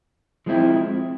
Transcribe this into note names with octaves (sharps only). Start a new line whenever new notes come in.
F3 G#3 C4 E4